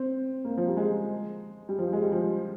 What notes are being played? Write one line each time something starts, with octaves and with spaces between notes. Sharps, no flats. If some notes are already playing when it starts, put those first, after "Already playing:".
Already playing: C4
A#3
F3
G3
G#3
G3
F3
G#3
G3
F3